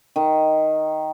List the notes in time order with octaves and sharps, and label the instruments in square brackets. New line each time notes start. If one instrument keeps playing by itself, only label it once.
[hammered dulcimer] D#3